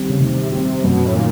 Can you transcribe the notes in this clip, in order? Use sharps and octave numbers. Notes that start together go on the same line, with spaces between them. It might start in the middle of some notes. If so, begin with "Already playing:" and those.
Already playing: D#3 G3 C4
C#3
C3 D#3
C3 G3 C4
F#2 B2
A2
A#2 D#3